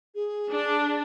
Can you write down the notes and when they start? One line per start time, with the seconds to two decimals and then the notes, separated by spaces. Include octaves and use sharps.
0.15 G#4
0.52 D4